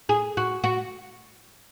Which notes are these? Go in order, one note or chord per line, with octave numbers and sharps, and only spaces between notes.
G#4
F#4
F#4